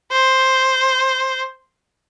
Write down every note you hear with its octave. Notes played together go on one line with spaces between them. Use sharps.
C5